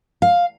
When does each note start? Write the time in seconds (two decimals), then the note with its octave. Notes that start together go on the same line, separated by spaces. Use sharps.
0.22 F5